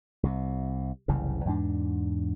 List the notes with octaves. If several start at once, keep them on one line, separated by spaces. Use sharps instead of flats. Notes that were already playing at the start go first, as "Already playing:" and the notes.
C2 C3
F#1 C2 C#3 E3
E2 G#2 D4